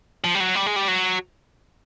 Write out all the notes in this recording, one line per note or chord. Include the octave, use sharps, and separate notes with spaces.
F3
G3
F#3
G3
G#3
G3
F#3